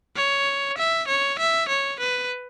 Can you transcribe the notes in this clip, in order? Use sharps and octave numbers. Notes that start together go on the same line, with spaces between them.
C#5
E5
C#5
E5
C#5
B4